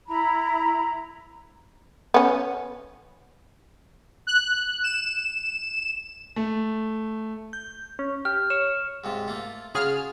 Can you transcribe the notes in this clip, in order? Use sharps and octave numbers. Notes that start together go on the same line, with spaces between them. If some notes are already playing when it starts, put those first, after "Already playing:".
E4 A#5 B5
B3 C#4
F#6
E7
A3
G6
C#4
G4 F6
C#5 E7
G#2 C3 F4
A3 A#3 F4
C#3 F4 F#4 G#4 F6